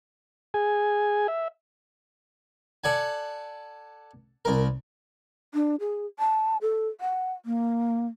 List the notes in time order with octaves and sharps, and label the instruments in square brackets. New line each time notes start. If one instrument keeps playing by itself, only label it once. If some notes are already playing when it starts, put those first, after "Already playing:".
[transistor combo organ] G#4 G#5
E5
[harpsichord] A4 D5 F#5 G#5
C2 A#4
[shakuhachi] D4
G#4
A5
A4
F#5
A#3